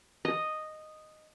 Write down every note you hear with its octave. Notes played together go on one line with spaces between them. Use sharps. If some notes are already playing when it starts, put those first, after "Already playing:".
D#5